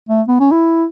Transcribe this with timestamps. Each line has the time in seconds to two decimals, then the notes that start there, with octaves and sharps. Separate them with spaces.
0.09 A3
0.28 B3
0.40 C#4
0.52 E4